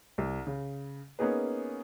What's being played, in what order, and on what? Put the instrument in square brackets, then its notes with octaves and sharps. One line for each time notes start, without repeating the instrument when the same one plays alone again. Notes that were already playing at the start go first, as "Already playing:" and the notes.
[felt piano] C2
C#3
A#3 B3 C#4 D#4 G#4 B4